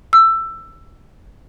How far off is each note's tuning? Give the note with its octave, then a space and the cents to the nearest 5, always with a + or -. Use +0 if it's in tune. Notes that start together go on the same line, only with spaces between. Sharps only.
E6 +15